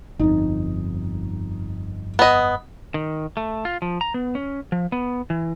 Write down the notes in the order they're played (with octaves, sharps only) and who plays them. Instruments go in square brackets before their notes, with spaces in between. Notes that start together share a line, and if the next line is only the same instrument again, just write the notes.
[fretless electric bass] G1 F2 [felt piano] D#4
[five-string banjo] B3 D#5
[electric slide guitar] D#3
A3
F4
F3
A#5
B3
C#4
F3
B3
E3